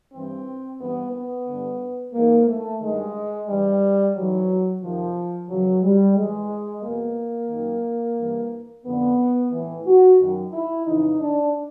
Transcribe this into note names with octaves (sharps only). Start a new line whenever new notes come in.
G2 E3 C4
G2 E3 B3
B3
G2 D3
G#2 E3 A#3
A3
G2 D#3 G#3
G2 E3 G3
G#2 E3 F#3
F2 C3 D#3 F3
F#2 C#3 E3 F#3
G3
A2 E3 G#3
E2 B2 A#3
F#2 D#3
G2 E3
F2 D3 B3
A2 E3
F#4
F#2 D#3
E4
F2 C#3 E3 D#4
D4